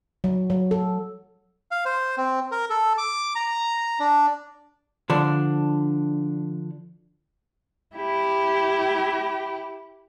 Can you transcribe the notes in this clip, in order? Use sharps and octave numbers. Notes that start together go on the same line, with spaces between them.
F#3
F#3
A4
F5
C5
C4
A#4
A4
D6
A#5
D4
D3 F3 D4
E4 G4